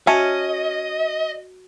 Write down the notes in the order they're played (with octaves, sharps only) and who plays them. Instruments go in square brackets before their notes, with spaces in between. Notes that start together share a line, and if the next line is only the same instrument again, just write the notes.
[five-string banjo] C#4 [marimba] F#4 [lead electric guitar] D#5 [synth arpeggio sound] E5 A5